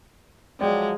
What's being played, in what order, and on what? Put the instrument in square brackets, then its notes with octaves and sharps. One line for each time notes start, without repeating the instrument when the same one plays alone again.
[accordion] F3 F#3 [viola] G#3 [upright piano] D5 G5